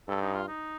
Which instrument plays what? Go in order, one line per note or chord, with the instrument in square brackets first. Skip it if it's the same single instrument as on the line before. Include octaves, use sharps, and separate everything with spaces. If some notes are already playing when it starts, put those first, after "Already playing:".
[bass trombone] G2 [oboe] A4
[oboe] D#4
F4
D#4